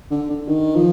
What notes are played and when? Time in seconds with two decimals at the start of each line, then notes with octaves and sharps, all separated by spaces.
0.11 D3
0.30 D3
0.48 D#3
0.76 F3